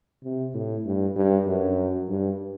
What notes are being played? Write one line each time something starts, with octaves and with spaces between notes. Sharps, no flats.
C3
A2
G2
G2
F#2
G2